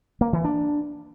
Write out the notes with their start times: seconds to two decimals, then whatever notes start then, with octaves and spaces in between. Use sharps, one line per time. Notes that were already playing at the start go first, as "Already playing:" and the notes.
0.21 A#3
0.33 E3
0.45 D4